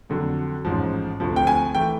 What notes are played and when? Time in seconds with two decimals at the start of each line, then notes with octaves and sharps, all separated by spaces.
0.09 F2 D3 F#3
0.65 A1 G#2 F3
1.20 D2 C3 F3
1.36 G5
1.47 G#5
1.75 E3 A3 G5